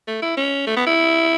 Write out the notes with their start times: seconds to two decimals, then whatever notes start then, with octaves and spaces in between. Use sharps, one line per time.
0.08 A3
0.22 E4
0.37 C#4
0.67 A3
0.77 B3
0.86 E4